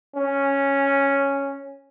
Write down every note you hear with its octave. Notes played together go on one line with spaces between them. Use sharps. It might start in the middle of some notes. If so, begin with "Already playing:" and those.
C#4